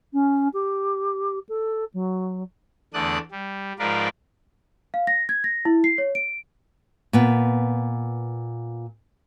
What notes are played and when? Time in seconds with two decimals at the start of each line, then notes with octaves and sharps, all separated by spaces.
0.13 C#4
0.53 G4
1.49 A4
1.94 F#3
2.94 E2 D3 A3 D5 D#6 F#6
3.31 G3
3.79 G#2 F3 F4 A#4 B4 D5
4.94 F5
5.07 A#6
5.29 G#6
5.44 A#6
5.65 E4
5.84 C7
5.98 C#5
6.15 D7
7.13 A#2 B3